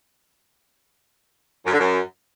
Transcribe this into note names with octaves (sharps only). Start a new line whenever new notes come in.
F#2
D3
F#2